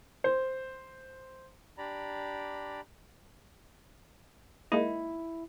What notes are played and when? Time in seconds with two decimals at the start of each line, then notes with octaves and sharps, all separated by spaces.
0.24 C5
1.78 D4 G4 D5 A#5 B5
4.72 G#3 A#3 D#4 E4